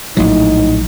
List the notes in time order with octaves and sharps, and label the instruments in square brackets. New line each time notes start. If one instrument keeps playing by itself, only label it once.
[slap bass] A#1 F#3 [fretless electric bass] A2 [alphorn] D#4